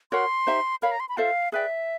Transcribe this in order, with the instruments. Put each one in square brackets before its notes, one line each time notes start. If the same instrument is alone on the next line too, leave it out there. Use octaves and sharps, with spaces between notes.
[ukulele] F#4 A#4 C#5 F#5 [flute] C6
[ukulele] D#4 G4 C5 E5
[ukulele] A#4 C#5 F5 [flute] B5
[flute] A#5
C6
B5
[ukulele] F4 A4 C5 E5 [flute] F5
[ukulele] G#4 B4 D5 G5 [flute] E5